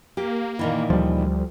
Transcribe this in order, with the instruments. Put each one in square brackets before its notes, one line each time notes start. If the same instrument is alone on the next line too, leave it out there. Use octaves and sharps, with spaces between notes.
[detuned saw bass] A#3 [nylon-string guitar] G4
[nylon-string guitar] A#2 D#3 E3
[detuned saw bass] D2 [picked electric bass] F3 G3